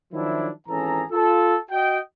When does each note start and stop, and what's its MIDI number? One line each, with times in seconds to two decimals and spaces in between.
0.13 0.49 51
0.13 0.49 53
0.13 0.49 54
0.13 0.49 62
0.13 0.49 64
0.68 1.03 32
0.68 1.03 52
0.68 1.03 61
0.68 1.03 68
0.68 1.03 69
0.68 1.03 82
1.11 1.57 65
1.11 1.57 69
1.71 1.98 66
1.71 1.98 75
1.71 1.98 79